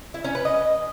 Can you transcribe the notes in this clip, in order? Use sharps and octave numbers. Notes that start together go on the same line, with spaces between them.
E4
C#4
B4
D#5